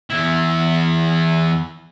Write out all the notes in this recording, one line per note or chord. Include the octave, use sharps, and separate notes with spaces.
E2 E4